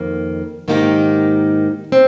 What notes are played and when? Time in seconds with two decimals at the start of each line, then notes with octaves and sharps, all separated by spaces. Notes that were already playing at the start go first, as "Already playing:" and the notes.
Already playing: F2 D#3 A#3
0.68 G#2 D#3 A#3 D#4 G4
1.92 C4